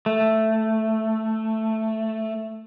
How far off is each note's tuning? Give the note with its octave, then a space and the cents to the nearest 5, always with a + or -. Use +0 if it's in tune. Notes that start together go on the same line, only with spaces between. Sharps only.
A3 +5